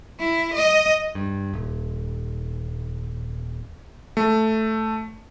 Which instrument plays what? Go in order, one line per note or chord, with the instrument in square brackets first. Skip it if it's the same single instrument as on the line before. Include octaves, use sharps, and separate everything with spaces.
[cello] E4
D#5
[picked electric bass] G2
D#1
[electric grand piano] A3